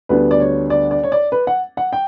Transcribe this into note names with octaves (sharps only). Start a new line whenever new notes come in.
D2 D3 G3 B3 D4 B4
D5
C#5
D5
D5
C#5
D5
B4
F#5
F#5
G5